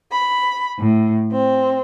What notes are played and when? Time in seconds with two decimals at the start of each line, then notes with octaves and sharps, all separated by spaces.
0.11 B5
0.80 A2
1.31 C4